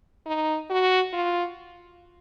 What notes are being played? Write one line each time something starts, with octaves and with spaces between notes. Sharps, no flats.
D#4
F#4
F4